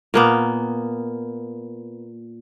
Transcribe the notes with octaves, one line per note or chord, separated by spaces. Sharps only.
A#2 A#3 B3